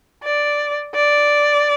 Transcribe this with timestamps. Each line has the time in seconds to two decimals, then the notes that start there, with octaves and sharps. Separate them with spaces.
0.23 D5
0.95 D5